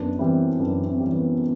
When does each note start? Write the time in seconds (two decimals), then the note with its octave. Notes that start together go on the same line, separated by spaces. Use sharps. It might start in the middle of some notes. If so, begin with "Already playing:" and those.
Already playing: F#2 B3 D4
0.19 E3 G3 C4 E4
0.59 F#2 B3 D4
0.86 C4
1.00 E3 G3
1.14 B3